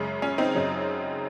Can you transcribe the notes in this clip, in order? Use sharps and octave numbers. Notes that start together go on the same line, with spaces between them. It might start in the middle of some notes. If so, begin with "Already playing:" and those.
Already playing: F#2 C#3 G#3
C#4
C4 D#4
F#2 C#3 F#3